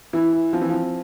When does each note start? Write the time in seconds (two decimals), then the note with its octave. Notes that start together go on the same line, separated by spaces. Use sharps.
0.13 E3 E4
0.33 E4
0.53 F3 C4
0.62 E3
0.69 F3 C4